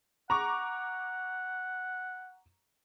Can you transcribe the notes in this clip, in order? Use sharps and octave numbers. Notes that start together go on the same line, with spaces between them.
F#5 A#5 C#6 D6